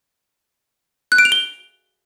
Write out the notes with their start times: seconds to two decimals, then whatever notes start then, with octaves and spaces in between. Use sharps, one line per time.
1.12 F#6
1.18 D7
1.25 F7
1.32 G7